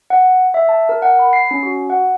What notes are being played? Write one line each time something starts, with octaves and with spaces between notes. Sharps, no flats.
F#5
E5
A5
A#4
F#5
B5
C7
C#4
F#4
F#5